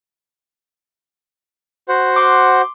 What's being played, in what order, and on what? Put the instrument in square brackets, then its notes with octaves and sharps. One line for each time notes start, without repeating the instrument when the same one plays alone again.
[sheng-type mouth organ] F#4 C5 F#5
[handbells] C6 D6